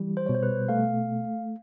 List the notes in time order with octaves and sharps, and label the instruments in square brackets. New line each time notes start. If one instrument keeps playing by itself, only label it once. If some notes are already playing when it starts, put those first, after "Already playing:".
Already playing: [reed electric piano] E3 G3
[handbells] C5
[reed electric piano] B2 [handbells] C#5
[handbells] C5
B4
[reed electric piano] A3 [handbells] F5